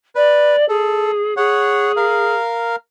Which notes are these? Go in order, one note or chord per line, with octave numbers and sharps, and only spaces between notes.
B4 D5
G#4 A4
G#4 C#5 F#5
A#4 F5